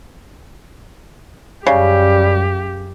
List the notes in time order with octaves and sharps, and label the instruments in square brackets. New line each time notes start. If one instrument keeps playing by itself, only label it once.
[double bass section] F#2 [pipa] C#3 [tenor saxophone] G3 [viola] G4